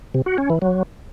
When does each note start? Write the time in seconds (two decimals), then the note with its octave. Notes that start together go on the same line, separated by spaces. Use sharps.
0.14 C3
0.26 F#4
0.38 C#4
0.50 E3
0.62 F#3